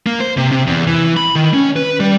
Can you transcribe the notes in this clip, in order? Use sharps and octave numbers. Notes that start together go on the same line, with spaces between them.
A#3
C5
C3
C3
E2
E3
B5
D#3
C#4
B4
G3